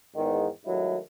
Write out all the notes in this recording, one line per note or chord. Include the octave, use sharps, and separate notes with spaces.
E2 G#2 D#3
G2 D#3 F#3 G#3 A3 E4